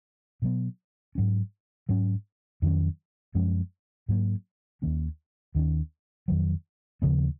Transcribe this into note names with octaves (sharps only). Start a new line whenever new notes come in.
B2 F#3 B3
G#2 F#3 C#4
G#2 F#3 C#4
F2 D#3 F#3 C#4
F#2 F3 G#3 C#4
G#2 F#3 A#3
D#2 D#3 A#3 C#4
D#2 D#3 A#3 C#4
F2 D#3 F#3
D#2 C#3 F3 B3